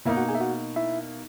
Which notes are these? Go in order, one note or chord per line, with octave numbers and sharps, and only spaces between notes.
B2 A#3 D#4 E4 E5
F#4 F#5
G#4 G#5
E5
F#4 F#5
E4 E5